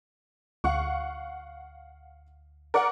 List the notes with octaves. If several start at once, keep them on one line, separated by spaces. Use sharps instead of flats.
D2 F5 F#5 C#6
A#4 D5 F#5